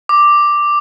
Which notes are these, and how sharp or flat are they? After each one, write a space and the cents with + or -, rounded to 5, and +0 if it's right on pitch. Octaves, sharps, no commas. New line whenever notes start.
D6 +5